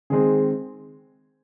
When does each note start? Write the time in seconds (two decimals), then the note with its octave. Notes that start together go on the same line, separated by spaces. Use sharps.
0.10 D#3 G#3 C4 G#4